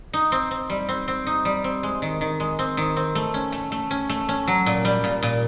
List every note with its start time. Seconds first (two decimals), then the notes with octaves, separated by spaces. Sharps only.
0.13 D#4
0.32 C4
0.51 C4
0.70 G3
0.89 C4
1.08 C4
1.26 D#4
1.45 G3
1.64 C4
1.83 G#3
2.02 D#3
2.21 D#3
2.40 G#3
2.59 C4
2.77 D#3
2.96 C4
3.15 A3
3.34 C#4
3.52 A3
3.72 A3
3.91 C#4
4.09 A3
4.29 C#4
4.47 F#3
4.66 A#2
4.85 G3
5.04 A#2
5.22 A#2